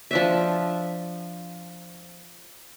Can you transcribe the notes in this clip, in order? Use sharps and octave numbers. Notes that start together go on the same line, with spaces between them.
F3 D4 E5